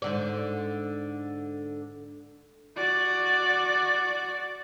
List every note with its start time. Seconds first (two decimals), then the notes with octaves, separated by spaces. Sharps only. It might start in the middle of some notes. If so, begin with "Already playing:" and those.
0.02 G#2 D3 D5
2.76 F#4 D5